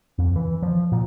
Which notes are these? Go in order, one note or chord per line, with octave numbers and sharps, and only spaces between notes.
F2
E3
F3
A#2